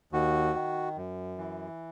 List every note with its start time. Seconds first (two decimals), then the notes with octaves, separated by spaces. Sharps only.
0.12 D#2 F#4
0.55 D#3
0.97 F#2
1.38 E3